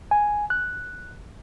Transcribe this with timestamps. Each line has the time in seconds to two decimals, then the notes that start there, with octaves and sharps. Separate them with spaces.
0.11 G#5
0.50 F#6